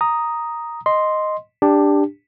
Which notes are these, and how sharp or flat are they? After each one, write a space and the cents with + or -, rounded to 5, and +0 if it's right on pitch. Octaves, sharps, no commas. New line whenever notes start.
A#5 +0 D#6 +0
D#5 +0 C6 +0
D4 +0 G4 +15